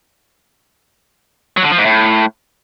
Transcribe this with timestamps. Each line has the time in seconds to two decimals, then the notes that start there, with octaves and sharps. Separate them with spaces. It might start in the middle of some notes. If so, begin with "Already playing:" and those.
1.57 F#3
1.64 D3
1.71 F3
1.78 G#2
1.85 A2